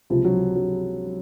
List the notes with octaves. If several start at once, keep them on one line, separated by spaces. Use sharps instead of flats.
C#2 C3 F3
F#3
F#3